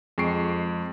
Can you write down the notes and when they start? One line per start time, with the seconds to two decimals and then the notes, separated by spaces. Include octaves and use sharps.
0.18 F2 G#3 C#6 C7 D7